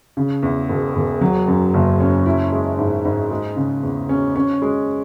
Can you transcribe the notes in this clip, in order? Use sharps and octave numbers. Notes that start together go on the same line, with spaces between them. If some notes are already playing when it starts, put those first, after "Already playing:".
C#3
E2
E1
E1
F#3
F#2
F#1
C#4
E4
G#3
G#2
G#2
G#3
C#3
E2
C#4
C#4
G#3